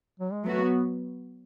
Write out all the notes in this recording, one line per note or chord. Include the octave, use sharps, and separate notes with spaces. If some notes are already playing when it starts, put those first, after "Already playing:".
F#3
G#3
F#3 A3 B3 F#4
B3